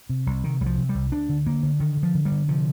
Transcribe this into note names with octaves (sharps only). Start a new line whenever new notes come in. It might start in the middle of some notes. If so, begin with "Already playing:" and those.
C3
C2
C3 D#3
C2 G3
F3
C3
G3
C2
D2 D4
D3
D3 A#3
D3
D3 D#3
D3
F3
D3
G3
D3
C3 F3